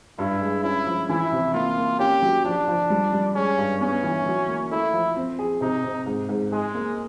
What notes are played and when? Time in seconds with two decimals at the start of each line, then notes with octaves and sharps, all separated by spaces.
0.19 G2 E4
0.41 G#3
0.64 C#4 E4
0.87 F3
1.09 E3 E4
1.32 C3
1.54 A#3 F4
1.77 A#3
1.99 C#4 G4
2.22 F#3
2.45 F3 D4
2.68 F3
2.90 G3
3.13 G3
3.35 G#3 C#4
3.58 G2
3.81 B3 C#4
4.03 E3
4.26 F#3
4.48 A#3
4.71 A3 E4
4.93 F3
5.16 C4
5.39 G#4
5.61 C3 D#4
5.84 C3
6.06 G#2
6.29 G#2
6.52 G#3 G#4
6.74 A#3